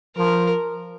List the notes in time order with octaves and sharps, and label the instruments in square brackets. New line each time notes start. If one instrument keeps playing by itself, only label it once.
[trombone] F3 [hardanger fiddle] A#4